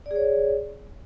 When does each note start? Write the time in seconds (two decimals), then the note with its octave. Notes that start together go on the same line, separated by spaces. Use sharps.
0.06 D5
0.11 G#4
0.16 C#5